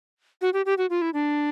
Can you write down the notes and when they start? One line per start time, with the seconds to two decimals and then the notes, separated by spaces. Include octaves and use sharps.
0.41 F#4
0.53 G4
0.66 G4
0.78 F#4
0.90 F4
1.02 E4
1.14 D4